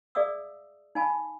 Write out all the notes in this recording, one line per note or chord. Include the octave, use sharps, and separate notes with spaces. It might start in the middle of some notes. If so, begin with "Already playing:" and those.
G#4 D5 E5 F5 D#6 E6
D#4 F5 G#5 A5 B5